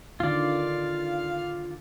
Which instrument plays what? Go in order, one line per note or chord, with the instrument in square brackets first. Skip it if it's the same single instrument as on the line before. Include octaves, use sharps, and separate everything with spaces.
[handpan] D3 D#3 [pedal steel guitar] F4 D5 [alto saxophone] F5